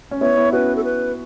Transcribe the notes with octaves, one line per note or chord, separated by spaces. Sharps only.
C#4
B3 E4 C#5
B3 E4
C#4 F#4 B4
A4
B4